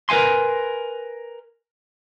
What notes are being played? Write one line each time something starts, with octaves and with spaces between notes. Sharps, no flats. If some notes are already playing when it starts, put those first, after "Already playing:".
A#4 B4 F5 G#5 C6